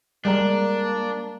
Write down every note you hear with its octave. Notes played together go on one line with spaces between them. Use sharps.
G3 G#3 A#3 D4 A#4 D5 A#5